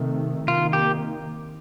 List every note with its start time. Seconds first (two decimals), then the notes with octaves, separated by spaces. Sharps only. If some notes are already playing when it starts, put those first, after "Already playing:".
Already playing: C3 D#3 A3
0.48 C3 D#3 A#3 F4
0.73 G4